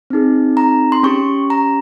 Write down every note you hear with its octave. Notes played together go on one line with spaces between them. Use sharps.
C4 D#4 G#4
A#5
C6
C#4 G4 C#6
A#5